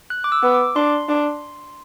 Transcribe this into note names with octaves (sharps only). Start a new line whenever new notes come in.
F#6
D6
E6
B3
D6
D4 C6
D4